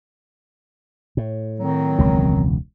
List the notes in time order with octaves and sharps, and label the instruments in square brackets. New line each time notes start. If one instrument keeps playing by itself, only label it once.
[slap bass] A2
[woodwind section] D#3 F#3 C4
[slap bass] E1 C#2